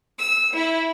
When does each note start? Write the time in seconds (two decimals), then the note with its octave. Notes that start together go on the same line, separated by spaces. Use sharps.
0.18 E6
0.52 E4